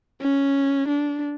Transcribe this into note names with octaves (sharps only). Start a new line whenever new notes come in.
C#4
D4